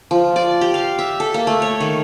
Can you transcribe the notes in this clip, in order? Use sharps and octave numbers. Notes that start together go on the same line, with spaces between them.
F3
D5
G4
F5
E5
A4
A#3
A3
C#5
D#3